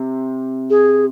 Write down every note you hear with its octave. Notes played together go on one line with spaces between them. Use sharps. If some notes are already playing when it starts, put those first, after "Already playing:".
Already playing: C3
G#4